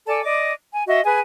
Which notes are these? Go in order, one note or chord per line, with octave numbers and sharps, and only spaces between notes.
A4 D5 G#5 A5
D5 D#5 D6
G#5
F#4 D#5 E5
G#4 B4 G#5